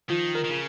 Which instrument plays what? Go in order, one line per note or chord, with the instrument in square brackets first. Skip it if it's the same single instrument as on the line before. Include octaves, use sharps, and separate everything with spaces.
[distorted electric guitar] D#3 [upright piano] F3
[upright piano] A#4
[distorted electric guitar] D#3
C#3